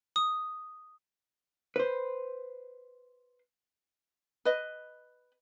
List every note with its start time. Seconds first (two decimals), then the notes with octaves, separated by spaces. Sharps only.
0.16 D#6
1.76 B4 C5
4.45 B4 D#5